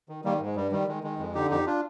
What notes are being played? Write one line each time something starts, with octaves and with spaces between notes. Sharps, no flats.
D#3
D#3 G3 A#3
G#2
G#3
G2 G3
D#3 G3
D#3 G#3
D#3 G#3
F2 G#3
D3 D#4 G4
F2 D#4 G4
D4 F4